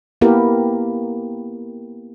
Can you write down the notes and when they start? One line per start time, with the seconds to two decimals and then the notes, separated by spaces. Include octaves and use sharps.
0.21 A#3 B3 E4 G4 A#4